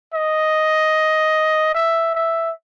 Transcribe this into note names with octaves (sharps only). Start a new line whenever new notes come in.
D#5
E5
E5